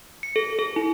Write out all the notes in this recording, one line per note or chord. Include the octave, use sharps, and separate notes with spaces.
C#7
A4
A4
E4